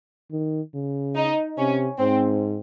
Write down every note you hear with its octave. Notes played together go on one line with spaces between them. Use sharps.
D#3
C#3
D#4
C3 C#4
G#2 C4